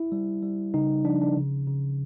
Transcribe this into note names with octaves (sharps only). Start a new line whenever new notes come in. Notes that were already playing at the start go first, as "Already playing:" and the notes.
Already playing: E4
G3
G3
C#3 D#4
F3 D4
D4
C#3
C#3